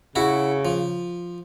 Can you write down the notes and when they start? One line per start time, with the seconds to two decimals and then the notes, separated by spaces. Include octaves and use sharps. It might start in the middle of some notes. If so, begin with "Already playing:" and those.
0.16 C#3 E4 F#4
0.65 F3